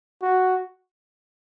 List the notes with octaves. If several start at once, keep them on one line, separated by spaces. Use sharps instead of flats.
F#4